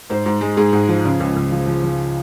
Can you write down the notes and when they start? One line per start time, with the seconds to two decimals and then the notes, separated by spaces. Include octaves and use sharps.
0.10 G#2 C5
0.26 G#2
0.41 G#3
0.57 G#2 G#4
0.73 G#2
0.89 F3
1.05 C#3
1.20 C#2
1.36 C#2
1.52 F3
1.67 F3
1.83 F3